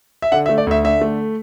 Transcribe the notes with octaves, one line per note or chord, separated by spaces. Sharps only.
E5
D3 F#5
E5
A3
D5
D2 E5
D3 E5
A3